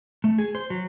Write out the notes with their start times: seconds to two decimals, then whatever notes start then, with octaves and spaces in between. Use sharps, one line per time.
0.24 A3
0.38 G#4
0.55 C5
0.70 F#3